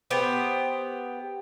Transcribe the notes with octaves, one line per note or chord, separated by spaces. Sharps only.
B3 G4 C5